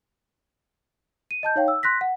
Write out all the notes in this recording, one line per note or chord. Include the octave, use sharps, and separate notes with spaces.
D#7
D#5 A5 G6
D#4 C#5 F5 G5
E6
C6 F#6 A#6 B6
F#5